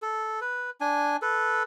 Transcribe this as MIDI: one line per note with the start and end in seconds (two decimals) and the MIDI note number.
0.02 0.40 69
0.41 0.70 71
0.81 1.17 62
0.81 1.17 80
1.22 1.63 69
1.22 1.63 71